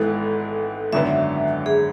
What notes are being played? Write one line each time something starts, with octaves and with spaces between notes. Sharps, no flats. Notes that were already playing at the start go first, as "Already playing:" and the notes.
Already playing: G#1 G#2 E3 B3 E4 A4
G#1 F#2 D3 F#3 B3 E5
G#4